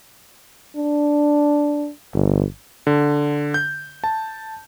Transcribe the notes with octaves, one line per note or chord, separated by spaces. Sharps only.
D4
G1
D3
G6
A5